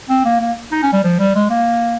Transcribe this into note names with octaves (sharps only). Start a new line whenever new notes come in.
C4
A#3
A#3
D#4
C#4
G3
F3
G3
G#3
A#3